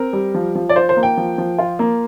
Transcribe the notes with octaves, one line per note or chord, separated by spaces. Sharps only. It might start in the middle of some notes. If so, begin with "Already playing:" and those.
Already playing: C4 A#4
G3
F3
F3
D5
F4 C5
C5
A#3
G5
F3
F3
F4
A#3